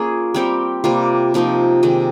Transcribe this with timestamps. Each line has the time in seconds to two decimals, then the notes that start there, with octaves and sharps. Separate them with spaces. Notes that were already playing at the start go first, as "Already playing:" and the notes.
Already playing: A#3 C#4 F4 G#4
0.34 G3 C4 G4 A#4
0.84 C3 G3 A#3 F4
1.34 C3 F3 A#3 D#4
1.83 C3 D#3 G#3